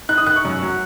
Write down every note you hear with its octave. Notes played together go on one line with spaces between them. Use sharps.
D#4 F#6
D#6
D#3 F#6
C#6
F#2
F#3